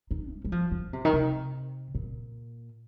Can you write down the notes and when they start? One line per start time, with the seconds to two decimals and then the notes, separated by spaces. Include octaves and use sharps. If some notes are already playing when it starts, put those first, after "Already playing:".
0.11 D#4
0.32 G3
0.45 G3
0.52 F3
0.71 F3
0.93 C3
1.05 D#3
1.13 C3
1.95 A#2